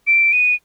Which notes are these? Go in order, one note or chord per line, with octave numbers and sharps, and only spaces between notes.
D7
D#7